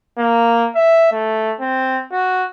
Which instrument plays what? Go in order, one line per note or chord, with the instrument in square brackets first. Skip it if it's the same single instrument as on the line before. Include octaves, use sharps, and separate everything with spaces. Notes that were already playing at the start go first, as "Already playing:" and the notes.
[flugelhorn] A#3
E5
A3
C4
F#4